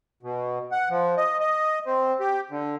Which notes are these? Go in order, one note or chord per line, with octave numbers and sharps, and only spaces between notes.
B2
F#5
F3
D#5
D#5
C4
G4
D3